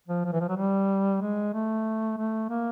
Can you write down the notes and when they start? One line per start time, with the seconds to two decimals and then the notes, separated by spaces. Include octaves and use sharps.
0.08 F3
0.25 F3
0.33 E3
0.40 F3
0.49 F#3
0.57 G3
1.21 G#3
1.54 A3
2.18 A3
2.50 A#3